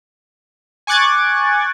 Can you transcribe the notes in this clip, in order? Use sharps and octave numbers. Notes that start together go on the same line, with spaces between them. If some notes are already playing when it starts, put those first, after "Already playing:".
G#5 C#6 D6 F#6 G#6 A6